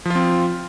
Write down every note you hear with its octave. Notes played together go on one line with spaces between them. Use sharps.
F3 C4 F4